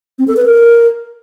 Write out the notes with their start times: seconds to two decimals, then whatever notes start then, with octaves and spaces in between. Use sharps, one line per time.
0.19 C4
0.28 A4
0.37 B4
0.45 A#4